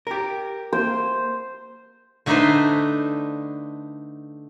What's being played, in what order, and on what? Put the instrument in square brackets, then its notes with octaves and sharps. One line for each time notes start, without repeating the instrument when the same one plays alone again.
[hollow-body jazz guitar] G4 A#4
[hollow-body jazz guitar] A#3 [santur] C5
[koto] D3 A3 D4 D#4 B4 C5